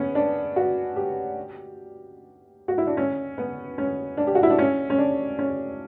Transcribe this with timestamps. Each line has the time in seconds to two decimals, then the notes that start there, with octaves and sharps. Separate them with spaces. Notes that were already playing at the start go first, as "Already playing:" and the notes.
Already playing: B3 C#4
0.15 D4
0.56 F#4
0.96 G4
2.68 F#4
2.78 E4
2.87 D4
2.97 C#4
3.38 B3
3.78 C#4
4.17 D4
4.27 G4
4.35 F#4
4.43 E4
4.50 D4
4.58 C#4
4.90 C#4
4.98 D4
5.39 C#4